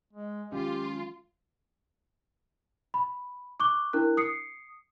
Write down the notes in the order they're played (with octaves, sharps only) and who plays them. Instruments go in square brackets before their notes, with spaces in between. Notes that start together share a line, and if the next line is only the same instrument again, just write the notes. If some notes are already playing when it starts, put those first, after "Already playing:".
[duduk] G#3
[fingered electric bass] D#3 F#3 G#3 [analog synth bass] C#4 [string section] F4 [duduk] G4
[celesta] B5
C#6 D6 F#6 G7
D4 E4 A#4 F#6
D#6 C7 C#7